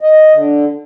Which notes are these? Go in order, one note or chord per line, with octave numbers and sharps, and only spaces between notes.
D#5
D3